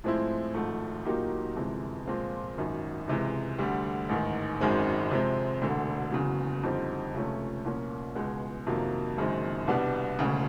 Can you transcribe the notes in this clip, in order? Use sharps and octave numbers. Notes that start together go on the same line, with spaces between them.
A2 F3 G#3 C4 E4
G#1 G#2 F3 A3
A#2 F#3 A#3 D#4 G4
G1 F2 C3 E3 G#3
A#2 F3 G#3 C4 F4
G#1 F#2 D#3
C#2 C3 E3 G#3
D2 D3 G3
A1 G#2 D#3
G#1 F#2 D#3 G#3 C4
C3 F3 G#3 C4
E1 D2 D3
F#1 E2 C#3 F#3
F2 D3 G3 C4 D#4
C#2 C3 F3 A3 C#4
C2 A#2 F3 A#3 C#4
C#2 B2 G#3 B3
F2 C3 D#3 F#3 A#3
F#1 F#2 D#3 G#3 C4
C2 B2 G3 B3 D4
E1 D2 C#3